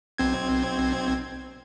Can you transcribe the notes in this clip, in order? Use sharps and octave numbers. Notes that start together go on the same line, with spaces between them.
B1 C4 G#6